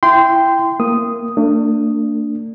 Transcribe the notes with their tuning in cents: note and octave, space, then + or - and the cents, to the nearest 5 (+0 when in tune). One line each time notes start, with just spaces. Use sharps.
E4 +15 G5 +0 C6 -20
A#3 +0 D#6 +0
A3 +45 D4 +0